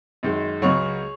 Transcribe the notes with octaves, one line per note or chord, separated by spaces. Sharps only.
F#2 D#3 G#3
C#2 C#3 F#3 G#4 C#5